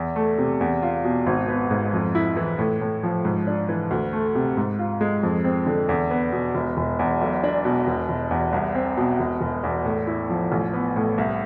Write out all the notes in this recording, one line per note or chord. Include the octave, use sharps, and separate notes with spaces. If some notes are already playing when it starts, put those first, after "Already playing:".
Already playing: E2
A3
C3
E2
F4
B2
G#1
B3
G#2
F2
E4
E3
A2
A2
F3
G#2
D4
E3
D2
A3
C3
G#2
F4
G#3
F2
C4
D3
E2
B3
B2
E1
E1
E2
B1
D4
B2
E1
E1
E2
C2
C4
B2
E1
E1
E2
A2
E4
F3
A1
B3
A2
C2